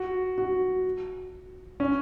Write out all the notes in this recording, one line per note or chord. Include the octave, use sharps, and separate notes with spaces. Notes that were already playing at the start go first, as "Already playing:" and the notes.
Already playing: F#4
F#4
C#4